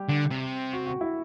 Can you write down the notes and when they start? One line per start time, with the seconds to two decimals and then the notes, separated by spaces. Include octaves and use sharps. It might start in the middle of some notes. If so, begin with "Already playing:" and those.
Already playing: G3 G4
0.09 D3
0.31 C3
0.73 F#4
0.86 F#4
1.01 E4